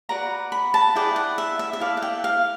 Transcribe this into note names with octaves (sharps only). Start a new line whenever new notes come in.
F#4 B4 D5 A#5
B5
A5
E4 G#4 B4 D5 G5
F#5
E5
E5
E5
E4 A4 D5 F5
F#5
G5
F5